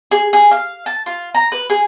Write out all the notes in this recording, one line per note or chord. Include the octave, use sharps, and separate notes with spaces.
G#4
G#4
F5
A5
F4
A#5
B4
G#4